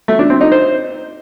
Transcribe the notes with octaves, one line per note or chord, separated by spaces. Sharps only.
A3
D4
C4
D#4
C5